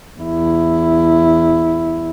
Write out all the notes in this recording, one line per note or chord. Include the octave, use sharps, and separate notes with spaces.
E2 E4